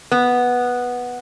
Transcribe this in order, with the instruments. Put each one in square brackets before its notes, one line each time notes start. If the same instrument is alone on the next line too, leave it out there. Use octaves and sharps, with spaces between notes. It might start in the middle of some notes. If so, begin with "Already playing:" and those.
[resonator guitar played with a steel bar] B3